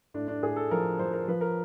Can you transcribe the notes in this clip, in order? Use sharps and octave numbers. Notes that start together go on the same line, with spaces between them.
A2 D4
D4
A2 G#4
A4
F3 A#4
F3 C5
A#4
F3 B4
A#4